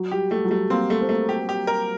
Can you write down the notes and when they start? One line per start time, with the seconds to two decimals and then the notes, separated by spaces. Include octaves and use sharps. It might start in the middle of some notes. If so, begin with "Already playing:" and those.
Already playing: F#3
0.11 G3 G4
0.31 G3 A3
0.45 F#3
0.50 G3 A3
0.70 A#3 C4
0.90 A3
1.01 C4
1.09 A3 A#3
1.29 G4
1.49 G4
1.67 A#4